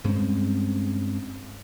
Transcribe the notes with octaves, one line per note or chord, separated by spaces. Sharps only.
G2 G#3 C4 C#4